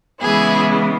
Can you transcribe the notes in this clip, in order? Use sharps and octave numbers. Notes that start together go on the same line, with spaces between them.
C#3 E3 G#3 B3 E4 G#4